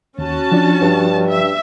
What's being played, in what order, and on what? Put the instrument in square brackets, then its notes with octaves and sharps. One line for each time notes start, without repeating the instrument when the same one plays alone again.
[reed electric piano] D#2 [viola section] C#4 F#4 A5
[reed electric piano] F3 D4
[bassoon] G2
[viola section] E5